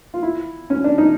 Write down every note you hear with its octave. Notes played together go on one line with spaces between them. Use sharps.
F4
E4
C#4
D4
D#4